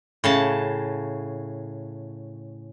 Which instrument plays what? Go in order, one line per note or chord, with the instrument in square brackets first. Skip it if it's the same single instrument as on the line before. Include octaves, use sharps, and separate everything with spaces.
[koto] A2 C#3 A5